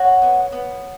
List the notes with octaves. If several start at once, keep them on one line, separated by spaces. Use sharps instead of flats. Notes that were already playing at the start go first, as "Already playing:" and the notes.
Already playing: F#4 C#5
B3
B3